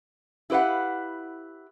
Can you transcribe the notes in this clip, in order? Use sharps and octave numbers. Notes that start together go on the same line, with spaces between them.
E4 G4 B4 F5 F#5